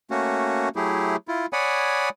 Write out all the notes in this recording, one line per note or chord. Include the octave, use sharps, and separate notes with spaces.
A3 A#3 C#4 F#4
F#3 A3 E4 G4 G#4
E4 F4
C#5 D5 F#5 G#5 B5 D#6